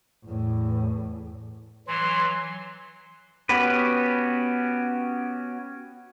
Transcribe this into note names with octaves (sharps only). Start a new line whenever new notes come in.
E2 A2
E3 F#3 C6
B3 C#4 F#4 G4 B4